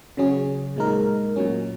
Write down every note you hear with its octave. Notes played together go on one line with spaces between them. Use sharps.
C#3 F#3 C#4 G#4
A#2 G#3 D#4 A#4
A#2 F#3 C#4